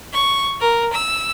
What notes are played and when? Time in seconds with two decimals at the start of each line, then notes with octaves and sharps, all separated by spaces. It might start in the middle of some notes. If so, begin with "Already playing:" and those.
0.12 C#6
0.60 A#4
0.92 E6